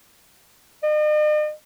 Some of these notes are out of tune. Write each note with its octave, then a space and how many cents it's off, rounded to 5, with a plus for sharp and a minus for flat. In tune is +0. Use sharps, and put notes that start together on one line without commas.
D#5 -45